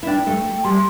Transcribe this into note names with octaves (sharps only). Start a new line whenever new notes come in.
E4
D4 G5
A3
A3
G3 C6